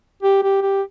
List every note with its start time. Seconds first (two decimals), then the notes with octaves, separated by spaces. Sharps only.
0.23 G4
0.43 G4
0.62 G4